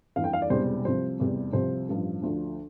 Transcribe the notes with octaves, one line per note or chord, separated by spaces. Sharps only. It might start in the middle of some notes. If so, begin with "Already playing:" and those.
G1 F2 E3 F5
G5
F5
D5
E1 E2 C3 G3 C5
C2 C3 F3 C5
F1 E2 C3 G3
C2 C3 F3 C5
A1 G2 F3
D2 D3 F3